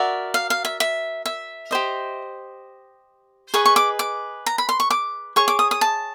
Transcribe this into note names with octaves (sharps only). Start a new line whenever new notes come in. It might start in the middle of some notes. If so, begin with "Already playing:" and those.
Already playing: F#4 A#4 D5 E5
F5
F5
E5
E5
E5
G4 C5 D#5
G#4 B4 D#5 C#6
C#6
D6
D6
A#5
B5
C6
C#6
D6
G#4 C#5 C#6
D6
D#6
D#6
A5